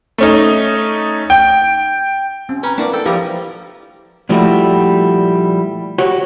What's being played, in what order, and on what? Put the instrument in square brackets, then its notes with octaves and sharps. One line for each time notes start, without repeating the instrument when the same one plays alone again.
[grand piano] A3 C#4 D#4
G5
[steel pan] C4 [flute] C#4
[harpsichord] C#4 [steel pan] B4 [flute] A#5
[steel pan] A#3 D4 E4 [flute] B4 [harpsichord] D5 F#5 A5
[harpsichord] A4 [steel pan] G5
[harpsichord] F3 G3 A#3 [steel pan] E4 G4 A#5
[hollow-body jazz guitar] A#2 F3 G3 A3 E4 F#4
F#4 G4 C#5